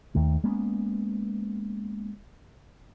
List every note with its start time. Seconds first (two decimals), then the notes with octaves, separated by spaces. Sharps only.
0.15 D#2 D#3 A3
0.44 G#3 A#3 B3 C#4